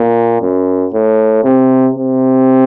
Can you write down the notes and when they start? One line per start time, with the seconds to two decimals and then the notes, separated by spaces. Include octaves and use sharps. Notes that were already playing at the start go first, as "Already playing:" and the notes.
Already playing: A#2
0.42 F#2
0.93 A2
1.44 C3
1.95 C3